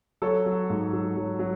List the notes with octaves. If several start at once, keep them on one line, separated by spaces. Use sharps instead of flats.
F#3 A4 C#5
F#3
G#2
F#3
F#3
F#3